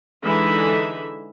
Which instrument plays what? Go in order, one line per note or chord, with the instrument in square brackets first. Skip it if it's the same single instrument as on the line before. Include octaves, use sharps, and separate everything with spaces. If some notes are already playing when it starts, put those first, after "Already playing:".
[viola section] D3 E3 G#3 D#4 E5 B5